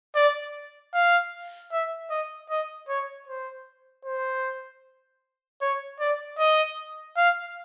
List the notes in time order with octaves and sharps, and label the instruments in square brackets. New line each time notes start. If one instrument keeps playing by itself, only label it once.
[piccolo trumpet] D5
F5
E5
D#5
D#5
C#5
C5
C5
C#5
D5
D#5
F5